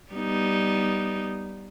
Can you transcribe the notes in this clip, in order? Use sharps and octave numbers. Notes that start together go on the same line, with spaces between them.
G3 B3 D#4